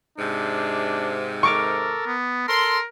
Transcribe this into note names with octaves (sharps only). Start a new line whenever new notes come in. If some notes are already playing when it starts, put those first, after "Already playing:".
G#2 C3 D4
A4 A#4 C#6 D6 F6
B3
A4 A#4 C6